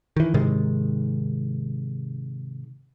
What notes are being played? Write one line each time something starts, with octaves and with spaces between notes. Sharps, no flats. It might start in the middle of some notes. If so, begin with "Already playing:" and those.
D#3 E3
G#2 C3 D#3 G#3